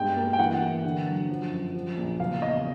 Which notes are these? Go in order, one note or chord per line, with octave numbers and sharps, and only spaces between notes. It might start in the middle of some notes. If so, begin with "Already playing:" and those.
Already playing: G2 B2 G#3 G5
A#3
G5
E3 F#5
E3
D3
F#3
F3
F#2
F3
A#1
F#1 F5
E2 D#5